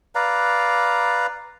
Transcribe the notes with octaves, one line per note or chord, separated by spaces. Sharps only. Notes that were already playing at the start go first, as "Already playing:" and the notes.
B4 D5 F5 A#5